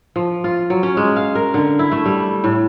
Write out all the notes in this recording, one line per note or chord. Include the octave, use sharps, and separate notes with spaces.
F3
F4
F#3
C#4
G#3
F5
A#4
D3
E4
A3
G3
A2